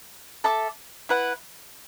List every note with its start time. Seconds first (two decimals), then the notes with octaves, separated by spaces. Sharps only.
0.44 A4 E5 A5 D6
1.09 E4 B4 F#5